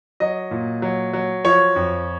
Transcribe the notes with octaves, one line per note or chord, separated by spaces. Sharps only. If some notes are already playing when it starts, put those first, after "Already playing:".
F#3 D#5
A#2
F#3
F#3
F3 C#5
F2